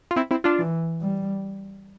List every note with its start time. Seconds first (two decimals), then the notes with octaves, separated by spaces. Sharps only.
0.11 F4
0.16 C4 E4
0.31 C4 E4
0.44 D4 F4
0.59 E3
1.01 G3